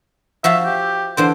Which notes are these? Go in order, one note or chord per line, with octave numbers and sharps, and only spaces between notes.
F3 F#4 E5 F5
G4
D3 E3 D4 C5